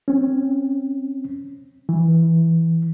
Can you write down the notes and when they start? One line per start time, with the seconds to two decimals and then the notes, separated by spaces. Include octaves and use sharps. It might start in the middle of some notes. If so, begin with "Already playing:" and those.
0.08 C4 C#4
1.89 E3